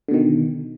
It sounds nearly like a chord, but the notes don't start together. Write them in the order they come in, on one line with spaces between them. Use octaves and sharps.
D3 B2 D#3